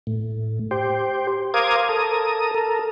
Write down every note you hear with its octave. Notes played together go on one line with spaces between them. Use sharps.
A2
G4 C5
A#4 C5 F5 D6 D#6 G#6
A4 A#4 D#6
A4 A#4